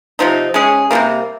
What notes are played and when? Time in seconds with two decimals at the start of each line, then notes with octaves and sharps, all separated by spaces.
0.19 C3 F3 C4 D#4
0.54 G#3 C#4 G#4
0.91 C3 D#3 G3 A#3